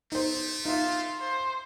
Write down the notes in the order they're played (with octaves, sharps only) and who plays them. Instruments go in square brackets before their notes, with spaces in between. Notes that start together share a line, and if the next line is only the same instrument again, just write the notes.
[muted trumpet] A3 [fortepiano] D#4 C5
[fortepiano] D#4 E5 [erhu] F4
[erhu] C5